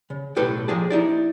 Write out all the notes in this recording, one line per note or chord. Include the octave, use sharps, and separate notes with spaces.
C#3
B1 A2 G4 A4 B4
F3 A#3 G4 G#4 D#5 A5
D#4 E4 D5